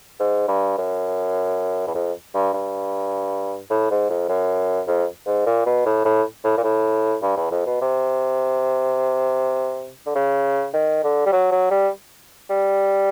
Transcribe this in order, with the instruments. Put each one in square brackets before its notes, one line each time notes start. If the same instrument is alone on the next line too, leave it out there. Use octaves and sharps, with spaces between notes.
[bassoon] G#2
G2
F#2
E2
F2
G2
G2
A2
G#2
F2
F#2
F2
G#2
A#2
B2
A2
A2
A2
A#2
A2
G2
E2
F2
B2
C3
D3
C#3
D#3
D3
G3
F#3
F#3
G3
G3